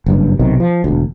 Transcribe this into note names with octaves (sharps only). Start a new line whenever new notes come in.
F#1 G2
B1 C3 D#3
F3
E1 D2